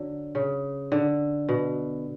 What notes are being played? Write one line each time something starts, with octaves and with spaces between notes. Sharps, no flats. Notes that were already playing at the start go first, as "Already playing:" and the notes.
Already playing: D3 F#3
C#3
D3
B2